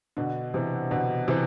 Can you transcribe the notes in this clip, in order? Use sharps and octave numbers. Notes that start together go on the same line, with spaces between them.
B2 D3
C3 E3
B2 D3
C3 E3